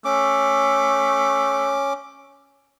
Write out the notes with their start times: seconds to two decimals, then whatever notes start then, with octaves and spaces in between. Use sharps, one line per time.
0.05 A3 C#4 D6